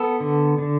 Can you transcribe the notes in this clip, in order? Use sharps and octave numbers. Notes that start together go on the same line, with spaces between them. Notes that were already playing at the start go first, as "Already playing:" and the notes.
Already playing: B3 A4
D3
D3